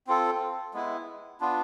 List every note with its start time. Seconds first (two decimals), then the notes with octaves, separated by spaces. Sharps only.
0.07 C4 F4 A4
0.74 G#3 B3 E4
1.41 B3 D4 F4